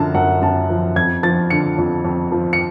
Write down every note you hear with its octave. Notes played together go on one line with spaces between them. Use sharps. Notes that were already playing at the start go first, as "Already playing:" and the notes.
Already playing: F#2 D3 F3 A5
F#2 F#5
F#2 A5
F3
F2 G#6
F3 A6
D3 C#7
F2
F2
F3
C#7